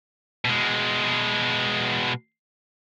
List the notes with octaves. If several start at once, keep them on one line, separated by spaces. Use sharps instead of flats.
B2 G#3